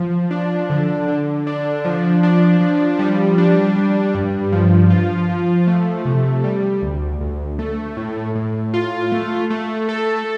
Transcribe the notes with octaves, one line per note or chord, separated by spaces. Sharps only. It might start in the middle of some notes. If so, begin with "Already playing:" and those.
Already playing: F3
D4
D3
D3
D4
F3
D4
F3
G3
D4
G3
G2
F3
F4
F3
A3
C3
G3
D2
D2
A3
A2
A2
F4
A3
A3
A4